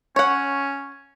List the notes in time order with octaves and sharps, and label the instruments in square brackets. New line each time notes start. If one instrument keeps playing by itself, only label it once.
[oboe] C#4 [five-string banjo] C#5 F#5